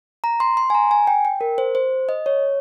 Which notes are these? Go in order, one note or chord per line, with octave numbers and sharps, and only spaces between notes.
A#5
C6
C6
G#5
A#5
G#5
G5
G5
A#4
C5
C5
D#5
C#5